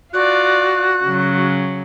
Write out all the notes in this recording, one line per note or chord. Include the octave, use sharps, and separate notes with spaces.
F4 F#4 D5 F#6
C#3 F#3